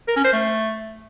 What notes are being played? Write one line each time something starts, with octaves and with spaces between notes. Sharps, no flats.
A#4
C#4
C5
A3